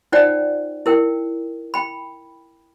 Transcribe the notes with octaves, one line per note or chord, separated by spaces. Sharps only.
D#4 F4 C5 D5 F#5 G5
E4 A#4 G5
G5 B5